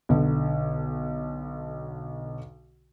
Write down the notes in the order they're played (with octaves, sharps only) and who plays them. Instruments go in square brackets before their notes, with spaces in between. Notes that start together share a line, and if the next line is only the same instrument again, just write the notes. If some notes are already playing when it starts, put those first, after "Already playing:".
[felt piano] B1 D3